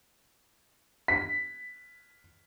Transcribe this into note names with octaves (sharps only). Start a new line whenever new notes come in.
B6